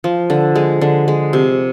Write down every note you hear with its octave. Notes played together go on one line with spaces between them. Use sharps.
F3
D3
G#3
D3
G#3
C3